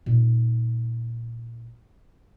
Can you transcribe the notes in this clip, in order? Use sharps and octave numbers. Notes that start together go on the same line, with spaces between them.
A#2 D#4